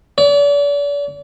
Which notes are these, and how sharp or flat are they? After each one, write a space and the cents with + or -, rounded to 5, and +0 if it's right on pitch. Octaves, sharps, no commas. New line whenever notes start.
D5 -40